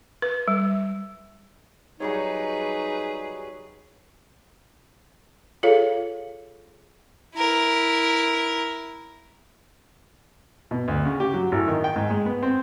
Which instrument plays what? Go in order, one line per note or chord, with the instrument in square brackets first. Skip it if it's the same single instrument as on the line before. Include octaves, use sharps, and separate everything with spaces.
[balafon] B4
G3
[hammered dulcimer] F#3 G3 C#5 [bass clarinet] D#4 [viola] G#4 B4
[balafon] F4 G#4 A4 C#5 F5
[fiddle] E4 A#4
[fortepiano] B2
D2
C#3
G4
F#3
A1
D#3
G5
G#2
G#3
B3
C4